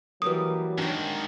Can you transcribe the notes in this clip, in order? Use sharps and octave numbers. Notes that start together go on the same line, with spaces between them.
E3 F#3 G3 A#3 B4 D#6
G#2 D#3 D4 C#5 G5